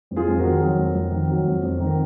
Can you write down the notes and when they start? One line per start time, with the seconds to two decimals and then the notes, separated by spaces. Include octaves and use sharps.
0.11 F2
0.16 F4 G#4
0.28 F2
0.39 F#4 A#4
0.45 D#3
0.61 F#3
0.79 F2
0.95 F2
1.12 D#3
1.30 F#3
1.46 F2
1.63 F2
1.80 D#3
1.87 A#4